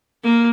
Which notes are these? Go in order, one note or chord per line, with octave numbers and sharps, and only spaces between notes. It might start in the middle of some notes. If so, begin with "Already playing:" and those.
A#3